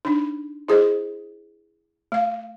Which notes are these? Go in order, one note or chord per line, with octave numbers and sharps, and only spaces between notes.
D4 D#4
E4 G#4 C5 D#5
A3 F5